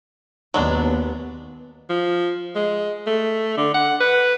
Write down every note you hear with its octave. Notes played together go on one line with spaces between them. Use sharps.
D#2 F#3 G#3 B3 D4
F3
G#3
A3
D3
F#5
B4